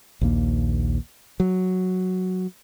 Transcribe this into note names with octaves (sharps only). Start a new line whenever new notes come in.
A#1 D#2 A#3
F#3